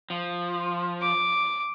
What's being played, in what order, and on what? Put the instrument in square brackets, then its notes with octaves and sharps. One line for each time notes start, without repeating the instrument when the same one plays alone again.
[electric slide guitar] F3
[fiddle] D6